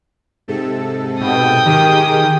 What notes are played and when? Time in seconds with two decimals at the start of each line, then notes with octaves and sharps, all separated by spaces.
0.48 G#2 C3 A4
1.21 B2 G5 D#6
1.66 D#3 G4 G#4